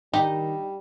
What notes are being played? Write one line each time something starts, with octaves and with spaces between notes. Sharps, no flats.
D#3 G3 D#4 G4